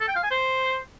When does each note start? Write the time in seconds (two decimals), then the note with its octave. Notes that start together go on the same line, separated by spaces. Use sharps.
0.01 A4
0.08 G5
0.16 F5
0.23 G#5
0.31 C5